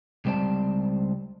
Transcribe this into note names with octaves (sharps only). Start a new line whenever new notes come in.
C#2 G3 C4 C5 D5 A5